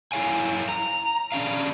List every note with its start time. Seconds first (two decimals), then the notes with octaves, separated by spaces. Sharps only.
0.12 E4 F4 C#5 F5 G#5
0.69 A#5
1.32 C#4 D4 F5